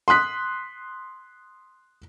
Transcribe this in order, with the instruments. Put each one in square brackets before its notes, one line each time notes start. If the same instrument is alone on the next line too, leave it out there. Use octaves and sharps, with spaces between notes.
[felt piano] C6 D#6 F#6 B6